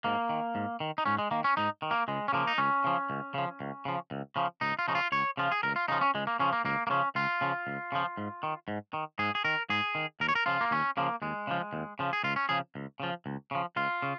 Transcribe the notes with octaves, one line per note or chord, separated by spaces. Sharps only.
G#2 A#3
D#3
G#2
D#3
D#4
G#2 C#4
G#3
D#3 A#3
C#4
G#2 D#4
D#3
A#3
C#2 G#3
C#4
C#3 F3 A#3
D#4
C#2 C#4
C#3 F3
C#2
C#3 F3
C#2
C#3 F3
C#2
C#3 F3
C#2 D#4
F4
C#3 F3 D#4
F4
C#2 C#5
C#3 F3 F4
G#4
C#2 A#4
F4
C#3 F3 D#4
C#4
C#2 G#3
A#3
C#3 F3 C#4
A#3
C#2 A#3
A#3
C#3 F3 C#4
C#2 F4
C#3 F3
C#2
C#3 F3
G#2
D#3
G#2
D#3
G#2 G#4
G#4
D#3 A#4
G#2 G#4
D#3
D#2 A#4
C#5
A#4
C#3 F3 F4
A#3
D#2 C#4
C#3 F3 A#3
D#2 G#3
C#3 F3
D#2
C#3 F3
G#4
C#2 F4
C#4
C#3 F3 G#4
C#2
C#3 F3
C#2
C#3 F3
C#2 F4
C#3